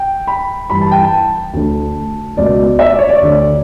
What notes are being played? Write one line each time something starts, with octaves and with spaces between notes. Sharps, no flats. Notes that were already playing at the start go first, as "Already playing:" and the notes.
Already playing: G5
B5
G2 E3 B5
A5
G5
A5
D2 D3
C#2 B2 D5
E5
D5
C#5
D5
D2 D3